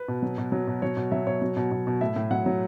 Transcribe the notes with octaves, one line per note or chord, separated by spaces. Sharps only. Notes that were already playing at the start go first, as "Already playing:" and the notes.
Already playing: B4
B2
F#3
B2
F#3
B2
F#3 C#5
B2
F#3 E5
B2 C#5
F#3
B2
B2
B2
A2 E5
A2
F#3 F#5
F#3